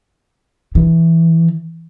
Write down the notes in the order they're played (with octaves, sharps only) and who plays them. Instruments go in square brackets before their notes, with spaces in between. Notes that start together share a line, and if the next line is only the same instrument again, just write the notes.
[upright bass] E3